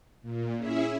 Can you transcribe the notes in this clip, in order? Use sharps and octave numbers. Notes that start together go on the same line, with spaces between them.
A#2
C#4 E4 G#4 E5